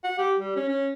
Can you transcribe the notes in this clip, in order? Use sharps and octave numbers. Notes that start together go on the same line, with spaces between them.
F#5
G4
G3
C#4
C#4